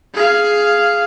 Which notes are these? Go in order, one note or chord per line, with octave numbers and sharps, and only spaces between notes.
G#4 F5